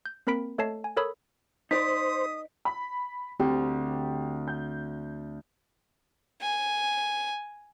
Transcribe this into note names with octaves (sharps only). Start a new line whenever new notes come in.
G6
A#3 C4 A#4 B5 B6 D7
A3 A4 C#5 D#5 A5 C7
G#5
A4 A#4 C#5 B5 D#6 E6
D#4 B4 C5 D5 D#6 B6
B5
D2 C4 G4
G6
G#5